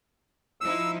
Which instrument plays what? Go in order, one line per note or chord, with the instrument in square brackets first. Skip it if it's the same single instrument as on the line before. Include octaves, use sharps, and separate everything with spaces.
[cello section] F3 D#4 E4 [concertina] E6